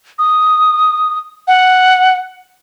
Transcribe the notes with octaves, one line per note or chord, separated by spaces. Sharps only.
D#6
F#5